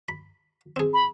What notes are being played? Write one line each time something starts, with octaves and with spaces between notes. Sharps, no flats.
B5
C4 G#4
B5